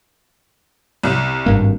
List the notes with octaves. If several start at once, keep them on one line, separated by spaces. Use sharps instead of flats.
C2
G#1 G2 A#3